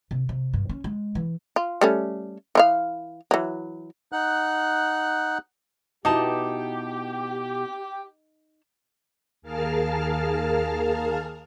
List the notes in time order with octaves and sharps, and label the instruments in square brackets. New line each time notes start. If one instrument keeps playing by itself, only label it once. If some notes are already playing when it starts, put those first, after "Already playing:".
[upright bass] C3
C3
G2
C#4
G#3
E3
[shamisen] F4
G3 A3 C#4
E3 F4 F5
E3 F#3
[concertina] D#4 F#5 F#6
[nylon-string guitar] B2 E4 [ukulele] D#4 A5 [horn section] G4
[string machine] D#2 G#4 A#4 F5 A5 F6